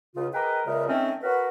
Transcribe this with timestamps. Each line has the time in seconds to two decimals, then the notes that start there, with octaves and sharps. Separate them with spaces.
0.16 C#2 C#3 F4
0.34 G#4 A#4 B4 D#5 G5
0.66 C#2 A#2 C#3 G#3 A#4 E5
0.88 D#3 A3 C4 C#4
1.23 F#4 A#4 B4